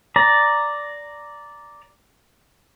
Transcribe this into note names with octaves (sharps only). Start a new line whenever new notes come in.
D5 A#5